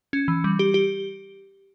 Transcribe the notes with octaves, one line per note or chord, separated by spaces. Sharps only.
C#4
E3
G3
G4
G4